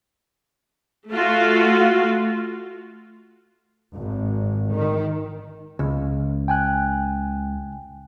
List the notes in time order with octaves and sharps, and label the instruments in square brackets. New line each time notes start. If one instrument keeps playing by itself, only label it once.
[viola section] A3 F4 F#4
[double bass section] G#1
D#3
[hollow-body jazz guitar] C#2
[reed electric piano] G5 G#5 F#6